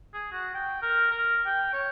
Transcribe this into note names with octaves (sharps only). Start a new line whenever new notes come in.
G#4
F#4
G5
A#4
A#4
G5
C#5